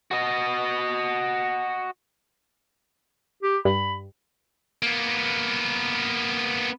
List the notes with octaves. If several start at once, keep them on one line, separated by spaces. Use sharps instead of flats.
F#4 D#5
G4
G2 B5
A#3 B3